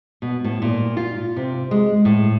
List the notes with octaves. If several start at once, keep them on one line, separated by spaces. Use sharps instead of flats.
B2
A2
A#2
F4
C3
G#3
A2